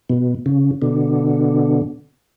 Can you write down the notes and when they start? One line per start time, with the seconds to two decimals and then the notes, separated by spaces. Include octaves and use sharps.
0.10 B2
0.46 C#3
0.82 B2 D3